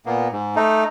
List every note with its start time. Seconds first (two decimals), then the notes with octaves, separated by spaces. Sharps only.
0.06 A#2 A#3 B3
0.32 G#2
0.56 A3 D#4